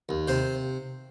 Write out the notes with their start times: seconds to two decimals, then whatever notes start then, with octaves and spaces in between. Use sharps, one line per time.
0.09 D#2
0.28 C3 C5